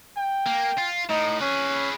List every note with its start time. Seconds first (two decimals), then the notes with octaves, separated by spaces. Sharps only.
0.17 G5
0.46 A#3
0.78 F4
1.09 A2 D#4
1.41 C#4 G#4 B4